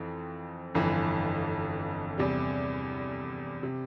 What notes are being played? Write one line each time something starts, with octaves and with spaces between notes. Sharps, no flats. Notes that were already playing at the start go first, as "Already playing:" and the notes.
Already playing: F2 E3 C4
G1 F2 E3
E2 C3 G3
C3